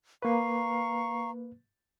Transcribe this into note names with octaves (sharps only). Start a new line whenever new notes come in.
A#3 B4 F5 A#5 C#6